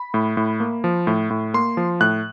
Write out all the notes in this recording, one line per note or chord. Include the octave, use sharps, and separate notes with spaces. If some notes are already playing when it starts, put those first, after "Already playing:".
Already playing: B5
A2
A2
A#3
F3
A2
A2
A#3 C6
F3
A2 F#6